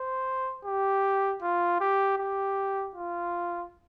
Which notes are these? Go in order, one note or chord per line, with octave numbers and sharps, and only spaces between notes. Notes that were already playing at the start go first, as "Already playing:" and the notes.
Already playing: C5
G4
F4
G4
G4
F4